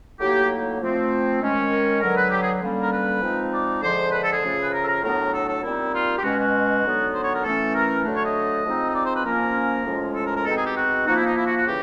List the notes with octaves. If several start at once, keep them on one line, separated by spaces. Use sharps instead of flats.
A2 F#3 A#3 D#4 G4
F3 A3 C4
D#3 G#3 C#4
A#4
D3 F#3 B3 A#4
B4
G4
G#4
D3 G3 A#3 C#4
A#4
B4
F3 G#3 C4 D#4
D5
D3 F3 G#3 C5
B4
A4
G#4
C#3 F3 A3
B4
A#4
A4
A#4
A2 F#3 B3 D4 A#4
A4
A4
A#2 G3 C4 D#4 E4
F4
G4
B2 G#3 C#4 F#4
F#4
D3 F#3 B3 D#4
C5
C#5
A#4
E3 A3 C#4 A4
A#4
D3 F#3 A3 D4
C#5
D#5
F3 G#3 C4 D#4
D#5
D5
C5
B4
F3 A#3 C#4 A#4
A2 F3 G#3 C#4
A4
A#4
A#4
B2 G#3 C4 D#4 A4
G#4
G4
F#4
F3 A#3 D#4 F#4
E4
D#4
E4
F#4
F#4
C#3 E3 G4